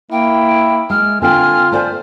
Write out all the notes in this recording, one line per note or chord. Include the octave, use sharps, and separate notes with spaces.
A#3 E4 G5
G#3 F6
D3 C4 F4 G5 G#5 F6
A3 C5 D5 G#5